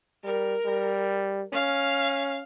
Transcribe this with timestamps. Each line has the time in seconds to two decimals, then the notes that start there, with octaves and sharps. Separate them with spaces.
0.24 G3 A#4
0.65 G3
1.53 C#4 F5